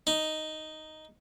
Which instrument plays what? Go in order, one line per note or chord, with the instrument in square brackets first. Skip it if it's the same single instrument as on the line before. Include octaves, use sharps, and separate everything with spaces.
[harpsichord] D#4